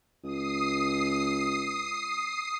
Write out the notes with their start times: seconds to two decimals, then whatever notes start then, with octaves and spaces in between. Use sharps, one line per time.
0.23 C#2 D#6 C7